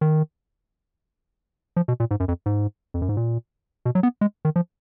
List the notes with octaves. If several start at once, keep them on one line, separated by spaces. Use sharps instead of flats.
D#3
F3
B2
A#2
G#2
F#2
F2
G#2
F2
F#2
G#2
A#2
B2
F#3
B3
G#3
D#3
F3